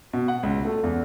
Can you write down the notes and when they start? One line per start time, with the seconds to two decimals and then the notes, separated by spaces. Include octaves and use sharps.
0.13 B2
0.28 F#5
0.43 C#2
0.65 A3
0.83 E2